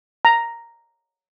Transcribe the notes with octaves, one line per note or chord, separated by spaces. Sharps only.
A#5